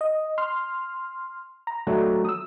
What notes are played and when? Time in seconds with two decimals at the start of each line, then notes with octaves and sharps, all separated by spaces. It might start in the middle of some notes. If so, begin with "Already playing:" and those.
0.01 D#5
0.38 C6 F6
1.67 A#5
1.87 F#3 A3 D4
2.25 D#6 E6